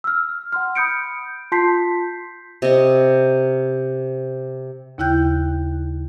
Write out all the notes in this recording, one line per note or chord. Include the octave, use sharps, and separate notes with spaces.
E6 F6
F#5 C6 F6
B5 D#6 G6 C#7 D7
F4 A5 C6 G6 B6 C7
C3 D#5
D#2 C#3 E4 G5 F#6 G6